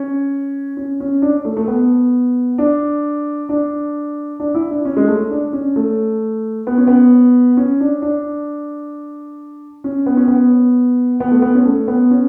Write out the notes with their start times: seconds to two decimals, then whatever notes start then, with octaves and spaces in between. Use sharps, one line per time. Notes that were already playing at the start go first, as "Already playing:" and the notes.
Already playing: C#4
0.77 C#4
1.00 C#4
1.22 D4
1.45 A3
1.57 A3
1.68 B3
2.58 D4
3.49 D4
4.40 D4
4.55 E4
4.71 D4
4.85 C#4
4.97 G#3
5.08 A3
5.31 D4
5.53 C#4
5.76 A3
6.67 B3
6.77 C#4
6.87 B3
7.57 C#4
7.81 D4
8.02 D4
9.84 C#4
10.06 B3
10.17 C#4
10.28 B3
11.20 B3
11.31 A3
11.42 B3
11.55 C#4
11.65 A3
11.88 B3
12.11 C#4